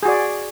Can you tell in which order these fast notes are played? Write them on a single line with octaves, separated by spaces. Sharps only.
G#4 F#4 D5